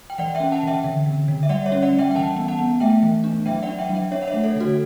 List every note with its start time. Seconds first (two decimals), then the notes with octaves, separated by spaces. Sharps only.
0.10 G5
0.18 E3 D5 F#5
0.35 E5 G5
0.40 C#4
0.52 F#5 A5
0.63 E3 E5 G5
0.84 D3
1.06 D3
1.28 D3
1.43 E5
1.49 G3 D5 F#5
1.66 C#5 E5
1.72 C#4
1.82 D5 F#5
1.93 G3
1.98 E5 G5
2.11 G5
2.15 E3 F#5 A5
2.36 B3
2.48 F#5 A5
2.59 B3
2.80 A3 E5 G5
3.03 E3
3.24 D4
3.46 F#3 E5 G5
3.63 D5 F#5
3.67 D4
3.79 E5 G5
3.89 F#3
3.95 E5 G5
4.11 D4 C#5 E5
4.22 F#5
4.27 C#5 E5
4.34 A3
4.44 A4 C#5
4.56 D3 F#4 A4